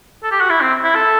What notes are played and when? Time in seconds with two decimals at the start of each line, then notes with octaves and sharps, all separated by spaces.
0.24 A4
0.31 G4
0.41 F#4
0.50 E4
0.61 C4
0.84 E4
0.95 A4